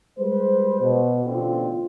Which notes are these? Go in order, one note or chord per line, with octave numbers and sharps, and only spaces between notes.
G3 G#3 B4 C5
B2
A1 B2 D3 C4 F4